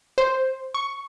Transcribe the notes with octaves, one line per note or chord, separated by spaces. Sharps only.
C5
C#6